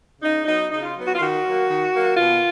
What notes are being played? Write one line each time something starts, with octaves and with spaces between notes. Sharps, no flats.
C#3 D#4
F#3 B3 D#4
C#3 D#4
F4
F#3 B3
F#4
F4
D#3 F#4
F#3 A#3
D#3
F#3 A#3
B2 F4